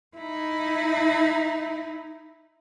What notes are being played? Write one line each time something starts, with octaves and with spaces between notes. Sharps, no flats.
D#4 E4